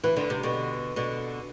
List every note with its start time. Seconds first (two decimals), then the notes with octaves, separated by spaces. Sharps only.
0.04 E3 B4
0.17 D3
0.30 C3
0.43 B2 D3
0.96 B2 D3